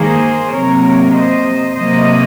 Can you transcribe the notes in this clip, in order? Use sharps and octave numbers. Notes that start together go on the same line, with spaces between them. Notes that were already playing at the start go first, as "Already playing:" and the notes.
Already playing: G#2 D#3 A#3 G#4 C5
C3 F#3 A#3 A#4 C#5
C5 D#5
C3 F#3 A#3 C5 D#5